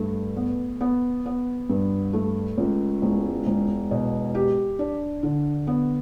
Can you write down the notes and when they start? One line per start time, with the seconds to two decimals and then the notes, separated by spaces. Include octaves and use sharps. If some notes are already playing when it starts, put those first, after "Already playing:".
Already playing: G2 A3
0.37 B3
0.81 B3
1.26 B3
1.70 G2
2.13 A3
2.57 C#2
3.02 E1
3.46 E1
3.91 B2
4.35 G4
4.79 D4
5.23 D3
5.67 B3